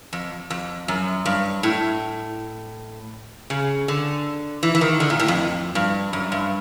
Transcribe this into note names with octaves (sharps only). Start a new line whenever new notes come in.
F2
F2
F#2
G2
A2
C#3
D3
E3
E3
D#3
D3
A#2
A2
F2
G2
F#2
G2